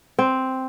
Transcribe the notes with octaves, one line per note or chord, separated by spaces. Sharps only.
C4